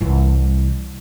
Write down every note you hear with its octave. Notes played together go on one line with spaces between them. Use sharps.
C2 E3